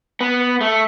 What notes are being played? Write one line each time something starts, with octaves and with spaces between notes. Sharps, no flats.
B3
A3